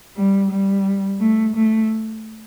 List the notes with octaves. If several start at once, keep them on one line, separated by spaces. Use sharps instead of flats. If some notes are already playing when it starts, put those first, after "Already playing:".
G3
G3
A3
A3